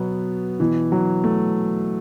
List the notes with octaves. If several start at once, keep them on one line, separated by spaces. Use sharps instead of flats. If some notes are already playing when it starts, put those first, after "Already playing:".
Already playing: B2 F#3 B3
B2 E3
F#3
A3